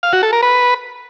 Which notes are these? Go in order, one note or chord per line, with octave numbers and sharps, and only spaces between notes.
F5
F#4
A4
A#4
B4